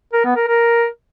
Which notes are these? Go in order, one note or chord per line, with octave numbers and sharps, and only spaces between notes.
A#4
B3
A#4
A#4